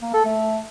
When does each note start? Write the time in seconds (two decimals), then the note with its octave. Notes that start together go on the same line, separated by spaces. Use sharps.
0.02 A#3
0.14 A4
0.25 A3